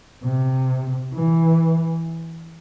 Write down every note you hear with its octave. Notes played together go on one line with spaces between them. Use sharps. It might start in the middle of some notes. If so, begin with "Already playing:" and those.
C3
E3